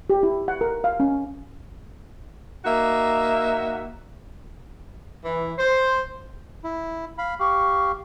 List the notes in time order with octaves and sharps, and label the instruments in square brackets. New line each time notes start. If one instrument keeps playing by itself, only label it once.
[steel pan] G4
E4
F#5
A#4
F5
C#4
[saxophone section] A#3 D#4 F#4 E5
[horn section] E3
C5
[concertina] E4
F5 B5
[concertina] G4 F5 [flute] C#6